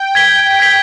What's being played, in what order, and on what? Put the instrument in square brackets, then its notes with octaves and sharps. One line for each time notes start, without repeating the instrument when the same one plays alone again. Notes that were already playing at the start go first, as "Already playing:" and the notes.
Already playing: [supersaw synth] G5
[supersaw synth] G5 [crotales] G#6 B6 G7
[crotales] G#6 B6 G7